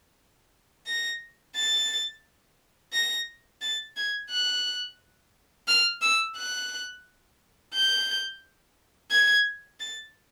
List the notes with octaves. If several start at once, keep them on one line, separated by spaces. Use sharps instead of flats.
A#6
A6
A#6
A6
G#6
F#6
F6
E6
F#6
G6
G#6
A6